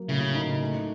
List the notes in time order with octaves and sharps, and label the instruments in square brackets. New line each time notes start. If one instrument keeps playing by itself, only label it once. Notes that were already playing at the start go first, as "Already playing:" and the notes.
Already playing: [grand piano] F#3 A#3
[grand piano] A2 [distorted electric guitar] C#3
[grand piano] D#4
A3